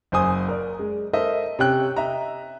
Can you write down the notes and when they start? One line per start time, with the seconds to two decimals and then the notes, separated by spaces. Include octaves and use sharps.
0.12 F#1 C5 G#5 D#6
0.48 A#4 D5
0.79 G#3
1.13 A4 A#4 C5 D#5 E5
1.59 C3 C#4 G5 F#6
1.96 D#5 E5 A#5